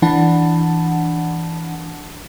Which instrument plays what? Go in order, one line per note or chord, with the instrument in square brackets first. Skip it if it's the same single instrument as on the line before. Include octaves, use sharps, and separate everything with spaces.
[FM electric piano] E3 D4 F#5 A5